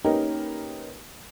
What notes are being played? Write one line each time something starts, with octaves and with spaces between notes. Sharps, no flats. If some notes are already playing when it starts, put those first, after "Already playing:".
A#3 C#4 D#4 G4 A#4 B4